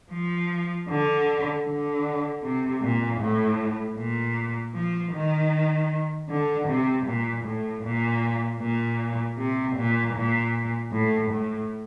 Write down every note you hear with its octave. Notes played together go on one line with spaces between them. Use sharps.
F3
D3
D3
C3
A#2
A2
A#2
F3
D#3
D3
C3
A#2
A2
A#2
A#2
C3
A#2
A#2
A2
A2